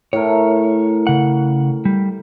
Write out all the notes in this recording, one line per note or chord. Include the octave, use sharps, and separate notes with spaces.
A2 A#4 C#5
C#3 F#5
G3